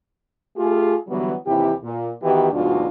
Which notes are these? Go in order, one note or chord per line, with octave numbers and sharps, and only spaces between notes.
A3 F4 G4 G#4
D3 E3 F#3 G3 B3
D#2 C3 E3 E4 G4
A#2
D#3 E3 B3 F#4 G4
D2 G#2 B2 F#3 D4 F4